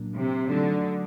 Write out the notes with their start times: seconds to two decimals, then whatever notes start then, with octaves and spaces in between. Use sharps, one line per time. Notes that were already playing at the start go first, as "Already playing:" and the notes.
Already playing: A#2 F#3 A#3 D4
0.16 C3
0.49 D3 F#3 A3 D#4